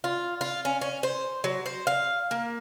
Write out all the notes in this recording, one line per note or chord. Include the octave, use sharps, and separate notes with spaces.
F4
F4
C#4
C#4
C5
F#3
C5
F5
A#3